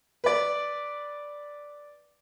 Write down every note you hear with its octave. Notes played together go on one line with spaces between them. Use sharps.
B4 D5